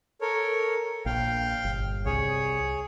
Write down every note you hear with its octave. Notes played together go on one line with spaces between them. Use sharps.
A4 A#4 C#5
A#1 F5 G5
G1
C2 G#4 C#5